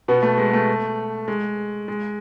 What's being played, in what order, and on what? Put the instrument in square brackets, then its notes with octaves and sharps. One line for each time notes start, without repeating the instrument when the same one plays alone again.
[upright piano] B2 B3
A3
G#3
A3
G#3
G#3